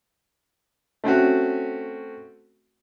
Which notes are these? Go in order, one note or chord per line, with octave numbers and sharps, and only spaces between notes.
A3 C4 C#4 F#4